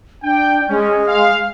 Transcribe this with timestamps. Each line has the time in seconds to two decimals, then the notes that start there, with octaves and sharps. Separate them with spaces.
0.23 D4 G5
0.68 G#3 C#4
1.07 F5